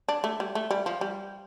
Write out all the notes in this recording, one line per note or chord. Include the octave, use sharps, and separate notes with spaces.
D4
A3
G3
A3
G3
F3
G3